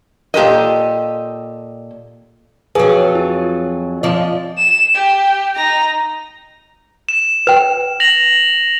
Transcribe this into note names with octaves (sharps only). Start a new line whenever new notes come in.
A#2 G4 A4 B4 D#5
F2 F#3 G#4 B4 G#5
F4
F3 D5 D#5
E7
G4
D#4 A#5
E7
B4 G5
A#6 F7 F#7